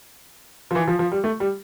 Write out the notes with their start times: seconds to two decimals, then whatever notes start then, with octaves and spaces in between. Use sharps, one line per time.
0.71 F3
0.75 E3
0.87 F3
0.99 F3
1.12 G3
1.24 A3
1.40 G3